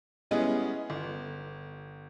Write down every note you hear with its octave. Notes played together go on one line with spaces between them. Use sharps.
G3 G#3 B3 C#4 E4 G#4
G1